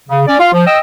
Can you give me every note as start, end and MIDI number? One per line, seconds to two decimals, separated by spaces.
0.09 0.22 49
0.27 0.35 61
0.27 0.35 74
0.40 0.52 65
0.40 0.52 77
0.52 0.66 53
0.67 0.79 75
0.67 0.79 79
0.67 0.79 88